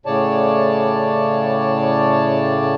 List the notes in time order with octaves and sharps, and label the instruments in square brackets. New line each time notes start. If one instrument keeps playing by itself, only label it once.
[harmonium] A2 C#3 C#5 D5 A5